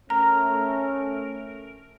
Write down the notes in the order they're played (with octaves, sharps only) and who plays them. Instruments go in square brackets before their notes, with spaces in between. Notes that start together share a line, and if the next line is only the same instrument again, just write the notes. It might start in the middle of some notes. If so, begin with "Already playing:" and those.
[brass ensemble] A3 C#4 [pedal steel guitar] A#4 [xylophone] A#5